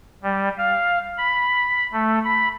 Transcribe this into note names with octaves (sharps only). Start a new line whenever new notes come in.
G3
F5
B5
A3
B5